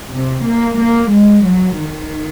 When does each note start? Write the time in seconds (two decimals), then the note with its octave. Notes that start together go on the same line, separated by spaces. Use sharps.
0.11 C3
0.45 A#3
0.79 A#3
1.12 G#3
1.46 F#3
1.80 D#3